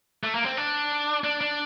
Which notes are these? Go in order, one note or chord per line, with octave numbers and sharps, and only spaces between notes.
A3
A#3
C4
D4
D4
D4